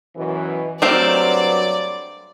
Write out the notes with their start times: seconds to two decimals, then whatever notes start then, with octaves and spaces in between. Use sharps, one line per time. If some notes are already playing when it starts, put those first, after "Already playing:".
0.17 F#2 B2 E3
0.82 G2 F#3 A3 C4 A#4 D5